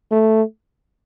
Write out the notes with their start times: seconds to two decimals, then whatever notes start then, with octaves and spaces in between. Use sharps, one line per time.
0.11 A3